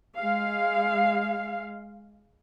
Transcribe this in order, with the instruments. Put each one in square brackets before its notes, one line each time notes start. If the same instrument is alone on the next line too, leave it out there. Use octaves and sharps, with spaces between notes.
[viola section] G#3 F5